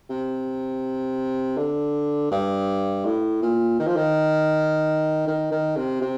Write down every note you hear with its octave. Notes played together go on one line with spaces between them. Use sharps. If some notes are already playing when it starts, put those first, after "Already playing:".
C3
D3
G2
A2
A#2
D#3
F3
D#3
D#3
D#3
C3
C3